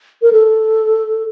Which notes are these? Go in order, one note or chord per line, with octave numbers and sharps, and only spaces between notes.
A#4
A4